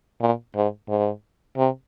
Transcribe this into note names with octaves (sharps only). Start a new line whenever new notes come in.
A#2
G#2
G#2
C3